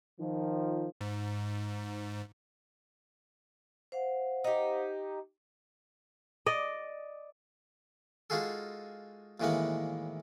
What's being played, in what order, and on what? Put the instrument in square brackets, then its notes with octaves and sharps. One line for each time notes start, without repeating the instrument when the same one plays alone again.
[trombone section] D#3 F3
[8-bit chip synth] G#2
[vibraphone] C5 F5 F#5
[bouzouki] D#4 G4
[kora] D5 D#5
[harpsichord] G#3 D#4 F4 F#4 G#4 A4
D#2 A2 E3 G#3 A#3 F#5